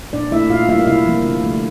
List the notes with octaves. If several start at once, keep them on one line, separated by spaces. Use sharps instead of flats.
A#2 D4 D5
A3 E4 E5
A#2 F4 F5
G3 A#3 E4 E5
F5
C3 E4 E5
F3 A#3
D3
A3